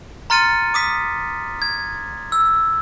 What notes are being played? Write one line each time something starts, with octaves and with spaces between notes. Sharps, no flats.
A#5 C6 F6 A6 C#7 D#7
D6 D#6 B6
G#6
E6